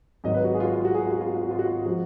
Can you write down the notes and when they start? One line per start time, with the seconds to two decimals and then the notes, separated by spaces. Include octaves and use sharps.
0.24 G#1 G#2 F#3 D#5
0.34 B4
0.44 F#4
0.54 G#4
0.60 F4
0.65 F#4
0.75 F4
0.85 F#4
0.95 G#4
1.05 F4
1.12 F#4
1.21 F4
1.27 F#4
1.36 F4
1.43 F#4
1.51 F4
1.59 F#4
1.66 F4
1.85 F3 G#3 F#4